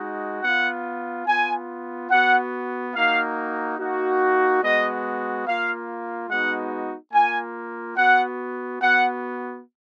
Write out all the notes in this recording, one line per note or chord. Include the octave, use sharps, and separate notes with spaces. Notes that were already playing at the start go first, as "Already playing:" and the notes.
Already playing: G#3 D#4 F#4
B3 F4 F#5
B3 F4 G#5
B3 F#4 F#5
A#3 D#4 F#4 F5
A#3 D#4 F#4
G#3 B3 F#4 D#5
A#3 F4 F5
G#3 B3 D#4 F#4 F#5
A#3 F4 G#5
B3 F#4 F#5
B3 F#4 F#5